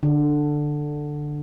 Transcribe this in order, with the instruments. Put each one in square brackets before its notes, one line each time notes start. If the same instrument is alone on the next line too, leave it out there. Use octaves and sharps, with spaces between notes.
[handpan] D3